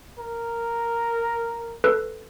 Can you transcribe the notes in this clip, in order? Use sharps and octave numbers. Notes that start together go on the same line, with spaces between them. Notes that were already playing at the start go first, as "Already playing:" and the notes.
A#4
A4 B4